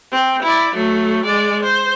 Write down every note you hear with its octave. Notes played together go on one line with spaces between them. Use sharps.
C4
E4 D5
F#3 A3
G#3 D5
C5